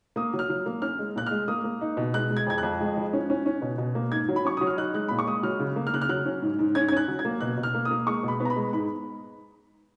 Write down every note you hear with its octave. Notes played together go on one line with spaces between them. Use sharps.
A#3 D#6
F#3
F6
F#3
A#3
C#4 F6
G#3
A#2 F#6
G#3 F6
A#3 D#6
A#3
D#4
B2
G#3 F#6
G#3
G#6
F2 G#6
F2 F#6
G#3
F3
C#4
C#4
C#4
B2
B2
A#3
G#2 G#6
F#3
B5
C#4 C#6
F#3 D#6
F6
D#4 F#6
G#3 F#6
A#2 B5
C#6
G#3 D#6
F#3 F6
C#3
A#3
F6
C#3 F#6
F6
F#3 F#6
C#4
G#2
G#2
C#4 G#6
G#6
C#4 F#6
F#3
G#6
A#3
B2 F#6
B2
F6
A#3
D#6
A#3
G#3 C#6
B2 B5
B3
A#5
B5
G#3
G#2 B5